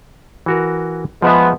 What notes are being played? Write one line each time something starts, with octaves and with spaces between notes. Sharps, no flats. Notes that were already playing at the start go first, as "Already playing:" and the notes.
E3 F#4 A#4
F3 G#3 B3 E5